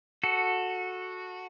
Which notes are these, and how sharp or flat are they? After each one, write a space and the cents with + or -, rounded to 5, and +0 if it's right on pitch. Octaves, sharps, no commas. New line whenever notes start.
F#4 -10 A4 +0